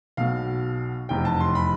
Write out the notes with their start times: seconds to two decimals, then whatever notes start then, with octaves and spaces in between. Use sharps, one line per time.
0.17 B1 B2 F5
1.09 F1 E2 C3 G5
1.25 A5
1.41 C6
1.55 B5